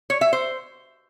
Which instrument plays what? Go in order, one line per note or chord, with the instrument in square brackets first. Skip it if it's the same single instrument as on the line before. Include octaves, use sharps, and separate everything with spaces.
[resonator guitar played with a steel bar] C#5
E5
C5